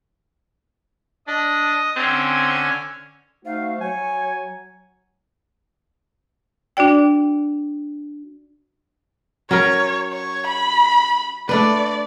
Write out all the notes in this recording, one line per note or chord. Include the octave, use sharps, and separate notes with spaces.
D4 D#5
D3 C4 C#4 G#5
A3 D#4 F#4 C5 F5
F#3 C#5 G#5
D4 F#4 D5 G5
F#3 C#4 A#4 C#5
C#5
B5
A3 D4 B4 D5